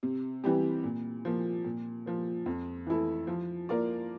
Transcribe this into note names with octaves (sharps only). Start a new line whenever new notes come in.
C3
E3 G3 C4 G4
A#2
F3 A#3
A#2
F3 A#3
F2
E3 A3 E4 A4
F3
A#3 F4 A#4 D5